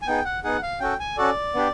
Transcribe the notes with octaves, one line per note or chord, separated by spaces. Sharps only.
G#5
B3 D#4 G#4 G5
F#5
B3 D#4 G#4 F#5
F5
C#4 F#4 A4 G5
G#5
C#4 F#4 A4 D5
B3 D4 G4